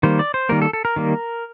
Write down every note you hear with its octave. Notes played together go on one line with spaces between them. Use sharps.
D#3 G3 A#3 C5
D5
C5
D#3 G3 A#3 A#4
A4
A4
A#4
D#3 G3 A#3